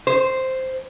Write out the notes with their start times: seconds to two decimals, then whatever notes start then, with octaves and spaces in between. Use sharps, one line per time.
0.07 C5